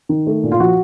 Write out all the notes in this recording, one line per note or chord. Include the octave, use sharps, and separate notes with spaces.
D#3
A3
A#2
F4
F3 F#4